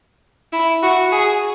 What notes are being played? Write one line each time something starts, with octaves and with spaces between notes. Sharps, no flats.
E4
F#4
G#4